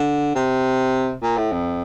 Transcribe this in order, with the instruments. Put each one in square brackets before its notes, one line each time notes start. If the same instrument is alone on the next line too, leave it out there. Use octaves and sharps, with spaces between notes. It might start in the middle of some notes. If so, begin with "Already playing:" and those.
Already playing: [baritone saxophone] D3
C3
A#2
A2
F2